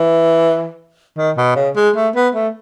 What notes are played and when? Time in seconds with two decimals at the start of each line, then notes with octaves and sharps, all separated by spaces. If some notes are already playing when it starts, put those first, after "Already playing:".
Already playing: E3
1.17 D#3
1.37 B2
1.56 C#3
1.76 G#3
1.95 A3
2.15 B3
2.34 A3